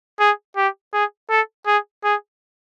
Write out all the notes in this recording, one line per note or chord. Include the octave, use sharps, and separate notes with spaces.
G#4
G4
G#4
A4
G#4
G#4